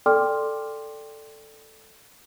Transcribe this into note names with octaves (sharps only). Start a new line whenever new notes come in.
A4 D5 G5 C6 D6 F6